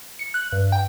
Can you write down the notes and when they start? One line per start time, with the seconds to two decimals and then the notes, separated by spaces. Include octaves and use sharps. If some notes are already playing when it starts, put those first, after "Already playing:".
0.19 C#7
0.34 F#6
0.52 G2
0.72 G5